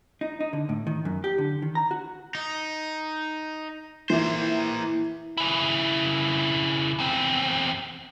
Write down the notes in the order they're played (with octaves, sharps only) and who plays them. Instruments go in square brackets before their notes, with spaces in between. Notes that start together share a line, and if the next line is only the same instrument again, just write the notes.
[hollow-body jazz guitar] D#4
D#4
D3
A2
D#3
F#2
G4
D3
D#3
A#5
F#4
[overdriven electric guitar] D#4
[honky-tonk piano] E3 E4 E5 [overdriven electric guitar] A#3 C5
[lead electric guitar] C#3 E4
E2 C4